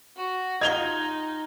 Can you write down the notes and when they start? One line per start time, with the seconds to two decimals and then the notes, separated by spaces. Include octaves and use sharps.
0.16 F#4
0.61 D#4 F4 G4 D#5 G#6 F7 G7